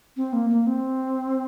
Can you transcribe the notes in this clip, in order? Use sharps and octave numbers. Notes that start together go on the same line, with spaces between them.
C4
A#3
A#3
C4